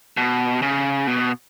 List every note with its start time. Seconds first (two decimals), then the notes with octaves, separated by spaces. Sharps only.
0.17 B2
0.62 C#3
1.07 B2